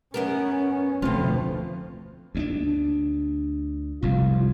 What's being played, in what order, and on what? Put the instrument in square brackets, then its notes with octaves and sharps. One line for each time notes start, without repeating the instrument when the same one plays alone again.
[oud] F#2 B3 A#4 [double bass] C#4
[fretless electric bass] F1 D2 C4 [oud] B2 F4 [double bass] F3 A3
[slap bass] D2 C4 D4
[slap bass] F1 C2 F2 [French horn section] F4